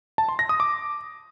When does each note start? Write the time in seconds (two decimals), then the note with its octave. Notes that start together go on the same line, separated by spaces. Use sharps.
0.18 A5
0.29 C6
0.39 A#6
0.49 D#6
0.60 D6